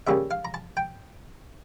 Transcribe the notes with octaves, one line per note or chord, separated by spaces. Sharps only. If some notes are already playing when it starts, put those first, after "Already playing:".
C#3 G3 A#3 C#4 E5
F5
A#5
A5
G5